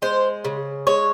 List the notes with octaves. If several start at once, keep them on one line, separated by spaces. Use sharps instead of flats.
G#3 C5
C#3
G#3 C#5